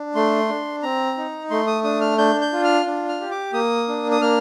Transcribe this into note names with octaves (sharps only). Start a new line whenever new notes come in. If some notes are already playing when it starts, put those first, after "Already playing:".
Already playing: D4
A3 C6
D4
C4 A#5
D#4
A3 C6
D#6
D4 D#6
F6
D4 G6
G6
F4
F6
D4
F6
G4
D6
A#3 D#6
D4
D#6
A#3 F6